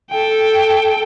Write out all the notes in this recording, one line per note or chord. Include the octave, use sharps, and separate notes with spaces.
A4 G5